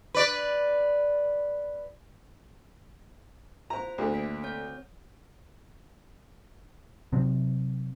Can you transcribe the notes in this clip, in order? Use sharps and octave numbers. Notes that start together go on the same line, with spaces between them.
B4 D5
F4 C5 A#5
D2 D3
A#3 B6 D7
C4 C#5 G6
C3 F#3 C4